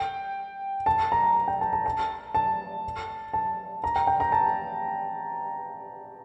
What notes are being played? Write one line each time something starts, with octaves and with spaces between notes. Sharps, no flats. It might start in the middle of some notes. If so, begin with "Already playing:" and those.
Already playing: G5
A5
A#5
A5
G5
A5
A5
A5
A5
A5
A#5
G5
G5
A#5
A5